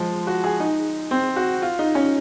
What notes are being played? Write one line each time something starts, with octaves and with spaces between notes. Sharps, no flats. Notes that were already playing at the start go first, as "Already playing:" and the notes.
Already playing: F3 G#3
F#4
G#4
D#4
C4
F#4
F4
D#4
C#4